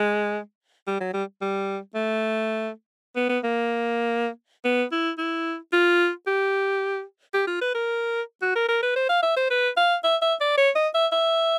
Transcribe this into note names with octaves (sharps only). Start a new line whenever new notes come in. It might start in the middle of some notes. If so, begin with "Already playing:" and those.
Already playing: G#3
G3
F#3
G3
G3
A3
B3
B3
A#3
B3
E4
E4
F4
G4
G4
F4
B4
A#4
F#4
A#4
A#4
B4
C5
F5
E5
C5
B4
F5
E5
E5
D5
C#5
D#5
E5
E5